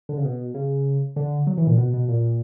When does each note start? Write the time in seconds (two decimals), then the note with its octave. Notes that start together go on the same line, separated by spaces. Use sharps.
0.09 D3
0.17 C#3
0.25 B2
0.54 C#3
1.16 D3
1.47 F#3
1.58 E3
1.67 A#2
1.78 B2
1.94 B2
2.08 A#2